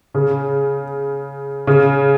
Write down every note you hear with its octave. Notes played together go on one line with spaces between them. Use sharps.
C#3
C#3